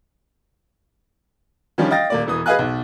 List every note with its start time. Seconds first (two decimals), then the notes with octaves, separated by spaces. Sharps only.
1.78 D#3 F3 G3 C#4 D4 F4
1.91 D#5 F5 G5 A6 A#6
2.10 D#1 A#3 D5
2.27 E1 E3 D#6
2.46 G#4 B4 D#5 F5 G#5 F#6
2.59 B1